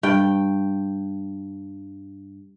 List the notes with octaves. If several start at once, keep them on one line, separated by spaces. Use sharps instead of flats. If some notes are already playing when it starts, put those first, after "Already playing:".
G2 G5